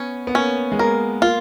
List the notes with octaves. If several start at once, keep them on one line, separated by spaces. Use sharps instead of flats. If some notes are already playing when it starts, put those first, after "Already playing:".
Already playing: B3 C#4
B3
A#3 C#4
G#3
A#3 A#4
A#3 F4